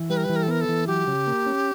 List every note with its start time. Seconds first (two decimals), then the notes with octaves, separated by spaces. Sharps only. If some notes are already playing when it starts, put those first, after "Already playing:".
Already playing: E3
0.10 G3 B4
0.17 A#4
0.24 B4
0.29 E3
0.36 A#4
0.43 A4
0.48 B3 A#4
0.61 A4
0.68 E3
0.87 F#3 G4
1.07 C#3
1.27 A#3
1.46 C#4